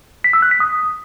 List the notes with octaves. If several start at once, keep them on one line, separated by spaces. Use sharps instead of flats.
B6
E6
F#6
B6
D#6